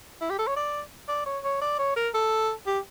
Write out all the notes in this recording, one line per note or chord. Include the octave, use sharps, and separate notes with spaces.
E4
G4
A4
C#5
D5
D5
C#5
C#5
D5
C#5
A#4
A4
G4